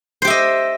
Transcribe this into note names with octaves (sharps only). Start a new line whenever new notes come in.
G4 C5 D#5 E5